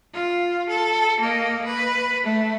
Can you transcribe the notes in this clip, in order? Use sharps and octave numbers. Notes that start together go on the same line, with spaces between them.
F4
A4
A#3 D#5
B4
A3